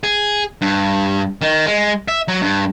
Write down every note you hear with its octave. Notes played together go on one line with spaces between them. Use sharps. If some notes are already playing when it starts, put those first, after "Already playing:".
G#4
G2
D#3
G#3
E5
F#3
G2